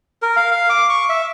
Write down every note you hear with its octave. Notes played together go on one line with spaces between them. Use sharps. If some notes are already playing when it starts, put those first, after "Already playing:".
A#4
F5
F5
D6
C#6
E5